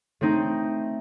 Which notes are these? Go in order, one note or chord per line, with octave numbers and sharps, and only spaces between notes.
A3 C4 D#4